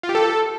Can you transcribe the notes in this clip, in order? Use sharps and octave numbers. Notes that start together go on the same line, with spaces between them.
F4
G4
A4